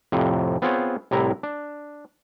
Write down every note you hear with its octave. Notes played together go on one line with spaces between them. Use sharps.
F2 A2 C3
B3 C4 F4 G#4 C5 C#5
C2 A2 C3 E4 A#5
D4